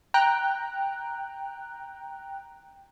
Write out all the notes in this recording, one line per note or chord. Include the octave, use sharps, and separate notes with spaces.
G5 A#5 F#6